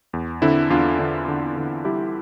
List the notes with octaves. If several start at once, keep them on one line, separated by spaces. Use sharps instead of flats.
E2
D3 C4 E4
E2 D4 F4
D3
D3
D3
G3 E4 G4